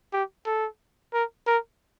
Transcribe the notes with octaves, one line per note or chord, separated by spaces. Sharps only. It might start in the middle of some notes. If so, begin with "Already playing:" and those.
G4
A4
A#4
A#4